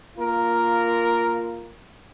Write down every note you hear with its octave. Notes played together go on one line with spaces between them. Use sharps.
A#3 F4 A#4